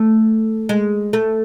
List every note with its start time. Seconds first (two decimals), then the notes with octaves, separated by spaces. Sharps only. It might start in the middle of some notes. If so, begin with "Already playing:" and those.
Already playing: A3
0.69 G#3
1.13 A3